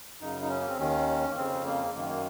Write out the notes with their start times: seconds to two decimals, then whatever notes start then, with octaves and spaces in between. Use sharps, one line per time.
0.21 F#2 C#3 D#4
0.42 D#4
0.49 C#4
0.61 A#3
0.69 C4
0.78 D#2 D#3 C#4
1.30 A#3
1.36 F2 C#3 C4
1.65 A#3
1.95 F#2 D#3 A#3
2.09 A#3